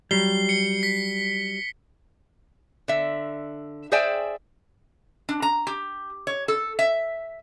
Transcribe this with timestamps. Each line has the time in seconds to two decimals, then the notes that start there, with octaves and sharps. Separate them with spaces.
0.11 F#3 G3 C7 G7
0.49 C#7 G7
0.83 B6
2.88 D3 E5
3.92 G#4 C5 D5 E5 G5 G#5
5.29 D4
5.42 A#5
5.67 G4
6.27 C#5
6.48 A4
6.79 E5